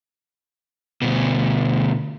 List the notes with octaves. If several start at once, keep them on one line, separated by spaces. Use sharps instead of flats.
D2 B2